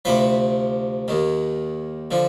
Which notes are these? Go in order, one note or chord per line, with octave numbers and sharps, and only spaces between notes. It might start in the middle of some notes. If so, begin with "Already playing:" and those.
D2 C3 F3 B4
D#2 D#3
D3 F3